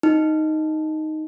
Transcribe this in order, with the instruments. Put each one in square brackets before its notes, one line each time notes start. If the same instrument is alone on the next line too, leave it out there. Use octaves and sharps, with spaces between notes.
[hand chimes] D#4